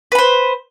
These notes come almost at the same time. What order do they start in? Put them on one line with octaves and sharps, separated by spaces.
B4 B5 C5